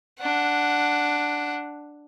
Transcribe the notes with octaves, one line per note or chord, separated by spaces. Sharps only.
D4 F#5